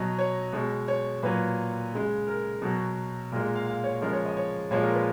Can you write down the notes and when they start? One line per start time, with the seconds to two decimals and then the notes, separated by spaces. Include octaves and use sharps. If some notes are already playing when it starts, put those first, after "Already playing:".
Already playing: B2 F#3 D#5
0.19 C#5
0.53 B2 G#3
0.88 C#5
1.23 A#2 F#3 B4
1.93 C#3 G#3
2.27 A#4
2.62 B2 F#3
3.32 A#2 G#3 A#4
3.55 F5
3.67 F5
3.84 C#5
4.01 C#3 F3 G#3 A#4
4.13 C#5
4.25 D#5
4.37 C#5
4.71 A#2 F3 G#3 C#5
4.83 A#4
4.94 B4